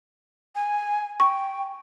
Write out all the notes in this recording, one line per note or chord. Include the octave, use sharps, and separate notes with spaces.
G#5
G5 C#6